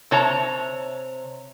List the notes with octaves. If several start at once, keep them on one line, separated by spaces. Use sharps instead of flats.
C3 C#5 A5 A#5